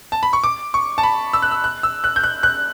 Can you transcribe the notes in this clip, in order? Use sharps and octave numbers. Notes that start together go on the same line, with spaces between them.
A5
B5
C#6
D6
C#6
A5
B5
E6
F#6
E6
F#6
E6
F#6
G6
F#6
F#6